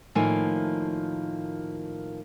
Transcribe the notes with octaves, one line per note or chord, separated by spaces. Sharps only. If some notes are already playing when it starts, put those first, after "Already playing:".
A2 D#3 F3 A#3 G#5